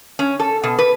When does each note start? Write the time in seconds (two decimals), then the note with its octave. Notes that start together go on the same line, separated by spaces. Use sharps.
0.19 C#4
0.39 A4
0.64 B2
0.78 B4